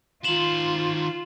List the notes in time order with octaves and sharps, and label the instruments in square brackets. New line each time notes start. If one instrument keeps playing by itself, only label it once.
[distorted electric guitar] D#3 C5 [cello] F4 [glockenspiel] E7 F#7